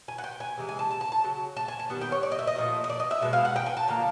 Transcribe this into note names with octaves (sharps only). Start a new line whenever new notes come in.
G#5
F#5
G5
G#5
C3 E3 G#3
G#5
A5
A5
A5
A5
C#3 F#3
A5
G#5
A5
D#3 G3 B3
G5
C#5
D5
D#5
E5
D#5
A#2 F3 A3
D#5
D5
D#5
E5
B2 G#3 B3 E5
F5
F#5
G5
G#5
A5
D3 F3 A#3 A#5